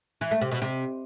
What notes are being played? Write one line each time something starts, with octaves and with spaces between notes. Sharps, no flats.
E3
A3
C3
B2
C3